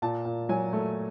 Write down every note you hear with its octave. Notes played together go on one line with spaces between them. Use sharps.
A#2 A5
A#2
F#3 G#5
A3